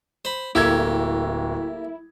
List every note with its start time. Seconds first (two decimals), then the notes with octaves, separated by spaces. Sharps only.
0.25 C5 B5
0.55 D1 A#3 E4 G4 A4 G#6